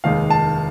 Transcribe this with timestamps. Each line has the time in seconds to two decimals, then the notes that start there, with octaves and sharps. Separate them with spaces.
0.04 F1 D#2 D#3 G#3 F5
0.30 A5